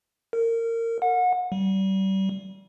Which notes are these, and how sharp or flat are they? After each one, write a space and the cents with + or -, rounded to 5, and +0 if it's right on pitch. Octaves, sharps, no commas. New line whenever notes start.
A#4 -25
F#5 -30
G3 -30